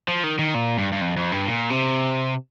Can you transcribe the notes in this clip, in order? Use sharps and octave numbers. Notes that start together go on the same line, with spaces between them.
F3
D#3
D#3
A#2
G2
G2
F2
F2
G2
A#2
C3